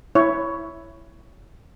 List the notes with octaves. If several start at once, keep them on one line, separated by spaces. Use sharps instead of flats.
E4 C#5